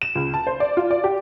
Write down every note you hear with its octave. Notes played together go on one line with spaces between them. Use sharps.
E7
C#2
A5
C5
D5
F4
D5
G4